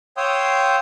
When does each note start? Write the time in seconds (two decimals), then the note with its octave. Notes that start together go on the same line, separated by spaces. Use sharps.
0.17 C#5 F5 G5 C6 D#6 E6